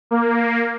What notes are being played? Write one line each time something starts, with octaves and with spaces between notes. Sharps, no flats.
A#3